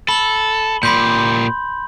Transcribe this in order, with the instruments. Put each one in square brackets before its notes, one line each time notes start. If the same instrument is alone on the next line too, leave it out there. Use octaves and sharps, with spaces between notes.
[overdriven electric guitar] A4 [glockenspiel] B5 F#7 G7
[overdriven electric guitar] A#2 G4 [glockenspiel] B5 C6 G6